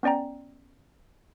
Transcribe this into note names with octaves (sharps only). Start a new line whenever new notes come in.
B3 C#4 D5 G5 A#5